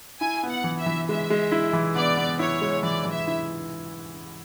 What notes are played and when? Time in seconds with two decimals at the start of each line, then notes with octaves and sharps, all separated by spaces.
0.20 E4 G#5
0.43 B3
0.50 F#5
0.64 E3
0.80 E5
0.86 E3
1.09 G#3 E5
1.30 G#3
1.52 E4
1.73 E3
1.95 B3 D5
2.17 B3
2.39 E4 C#5
2.61 G#3
2.83 E3 D5
3.05 E3
3.13 E5
3.27 E4